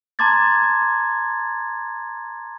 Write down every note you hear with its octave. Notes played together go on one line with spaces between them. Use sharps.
A5 A#5 C6 D6 G#6 A6